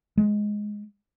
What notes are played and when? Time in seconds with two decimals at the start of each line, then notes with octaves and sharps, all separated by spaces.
0.17 G#3